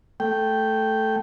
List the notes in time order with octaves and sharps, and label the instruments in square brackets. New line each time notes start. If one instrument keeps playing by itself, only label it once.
[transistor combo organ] A3 G5